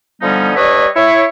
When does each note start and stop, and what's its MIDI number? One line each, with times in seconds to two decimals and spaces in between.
0.22 0.51 50
0.22 0.51 53
0.22 0.51 55
0.22 0.51 59
0.22 0.51 61
0.22 0.51 63
0.55 0.87 55
0.55 0.87 62
0.55 0.87 71
0.55 0.87 73
0.55 0.87 75
0.55 0.87 76
0.95 1.23 64
0.95 1.23 73
0.95 1.23 76